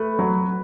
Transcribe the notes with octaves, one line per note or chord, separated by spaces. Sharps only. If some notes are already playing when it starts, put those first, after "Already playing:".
Already playing: A3 B4
F#3